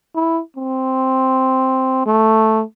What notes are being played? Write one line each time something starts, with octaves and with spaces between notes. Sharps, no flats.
E4
C4
A3